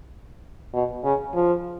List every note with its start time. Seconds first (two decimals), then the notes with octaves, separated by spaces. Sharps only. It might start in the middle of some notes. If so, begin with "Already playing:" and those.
0.73 B2
1.04 C#3
1.34 F3